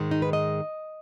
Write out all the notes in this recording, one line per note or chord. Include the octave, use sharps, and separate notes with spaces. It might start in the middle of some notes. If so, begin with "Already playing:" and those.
Already playing: G#2 D#3 G#3
D#4
B4
D#5